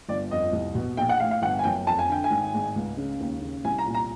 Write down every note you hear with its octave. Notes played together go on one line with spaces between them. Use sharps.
G1 D5
F2 D#5
C2
B2
A#1 G5
F#5
A2 F5
F5
G1 F#5
G#5
F#2 G5
F2 A5
G#5
D3 G5
G#5
G#1
G#2
C#2
C#3
D#2
C#3
C2 G#5
A#5
A#2
A#5